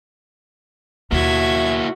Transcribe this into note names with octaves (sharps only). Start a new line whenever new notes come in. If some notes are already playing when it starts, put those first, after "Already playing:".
D#2 B2 A#3 E4 F#4 E5 G#6